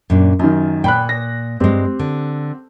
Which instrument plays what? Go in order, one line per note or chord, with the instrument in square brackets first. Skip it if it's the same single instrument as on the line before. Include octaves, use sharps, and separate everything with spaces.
[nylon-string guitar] F#2 A#2 D4
[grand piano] F#2 D#3 [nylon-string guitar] F4
[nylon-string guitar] A#2 [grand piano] G5 B5 F#6
[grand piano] A#6
[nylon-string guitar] G2 G#3 [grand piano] C4 G4
[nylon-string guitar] D3